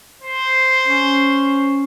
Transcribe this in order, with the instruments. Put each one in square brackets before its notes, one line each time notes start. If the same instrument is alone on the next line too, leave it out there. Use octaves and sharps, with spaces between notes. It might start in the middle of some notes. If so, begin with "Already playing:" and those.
[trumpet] C5
[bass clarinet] C#4